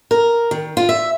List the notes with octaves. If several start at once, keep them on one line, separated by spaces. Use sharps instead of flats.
A#4
D#3
F4
E5